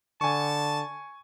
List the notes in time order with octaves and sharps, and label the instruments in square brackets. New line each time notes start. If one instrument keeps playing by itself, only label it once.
[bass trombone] D3 [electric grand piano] G#5 C#6 [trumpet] A5